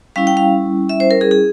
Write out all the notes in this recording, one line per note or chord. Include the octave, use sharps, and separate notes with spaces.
G3 C#4 E4 F5
G5
F5
E5
C5
A#4
G#4
G#4